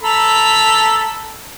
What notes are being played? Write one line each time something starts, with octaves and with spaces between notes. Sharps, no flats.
A4 A#5 B5